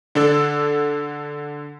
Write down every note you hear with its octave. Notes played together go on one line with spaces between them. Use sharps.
D3 D4 A4